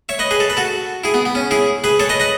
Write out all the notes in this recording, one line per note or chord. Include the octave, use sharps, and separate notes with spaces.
C#5 E5
B4 D#5
G#4 B4
A4
B4
F#4 A4
E4 G#4
B3
B3
C#4
E4 G#4
G#4 B4
A4 C#5
B4 D#5
B4 D#5